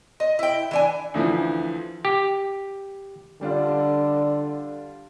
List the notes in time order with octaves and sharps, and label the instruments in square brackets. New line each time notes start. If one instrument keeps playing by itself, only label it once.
[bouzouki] D#5
E4 G5
E3 D4 G#5
[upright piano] D2 E3 F3
[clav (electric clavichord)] G4
[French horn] D3 [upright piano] G3 D4 F4